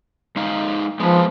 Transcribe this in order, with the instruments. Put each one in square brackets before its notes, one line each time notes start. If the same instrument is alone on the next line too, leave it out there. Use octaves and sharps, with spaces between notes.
[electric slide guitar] G#3 D#4 F5
[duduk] F3 [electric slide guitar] G#3 B3